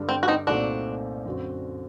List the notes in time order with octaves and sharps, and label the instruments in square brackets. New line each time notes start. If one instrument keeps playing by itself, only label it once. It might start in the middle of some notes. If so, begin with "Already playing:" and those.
Already playing: [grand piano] G2 D3 G3 D4 A4
[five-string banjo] C4
F#4
C4 D#4
[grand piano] C2 A#2 A3 C4 D#4 [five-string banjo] D4 F#4
[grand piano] F#2 D3 F#3 C4 F#4